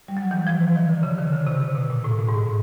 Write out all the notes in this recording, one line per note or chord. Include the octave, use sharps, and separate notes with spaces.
G3
F#3
E3
F3
E3
D#3
D3
C#3
D#3
D3
C3
C3
B2
A#2
A2
A2
G#2
A2